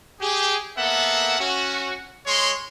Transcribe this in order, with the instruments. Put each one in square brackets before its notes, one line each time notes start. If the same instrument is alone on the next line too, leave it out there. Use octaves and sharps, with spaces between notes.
[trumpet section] G4 G#4
A#3 B3 A4 E5 F#5
C#4 F#4
G#3 C#5 C6